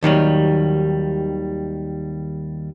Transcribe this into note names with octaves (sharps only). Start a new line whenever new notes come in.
D#2 D#3 F#3 G3